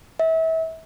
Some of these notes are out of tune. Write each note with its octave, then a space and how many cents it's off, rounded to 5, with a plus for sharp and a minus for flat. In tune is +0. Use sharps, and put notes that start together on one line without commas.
E5 -30